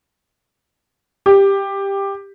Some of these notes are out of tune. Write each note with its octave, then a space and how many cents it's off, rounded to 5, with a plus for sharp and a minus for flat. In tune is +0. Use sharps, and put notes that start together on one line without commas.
G4 +10